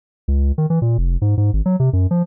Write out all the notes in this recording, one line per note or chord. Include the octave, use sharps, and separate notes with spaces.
C#2
D#3
E3
A#2
F1
G#2
G#2
G#1
F#3
C3
F#2
F3